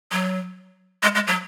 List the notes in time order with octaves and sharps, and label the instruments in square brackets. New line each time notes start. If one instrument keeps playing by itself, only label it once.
[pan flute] F#3
G#3
G#3
F#3